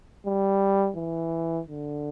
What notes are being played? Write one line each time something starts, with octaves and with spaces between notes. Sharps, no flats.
G3
E3
D3